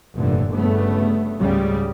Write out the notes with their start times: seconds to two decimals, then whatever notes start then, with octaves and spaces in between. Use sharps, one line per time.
0.17 F1 G2 A#2 D3 E3
0.54 G1 G2 C#3 A3 B3
1.38 C#2 G#2 C#3 G3 G#3